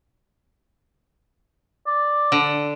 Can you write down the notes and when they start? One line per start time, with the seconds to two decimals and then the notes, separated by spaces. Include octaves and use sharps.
1.87 D5
2.32 D3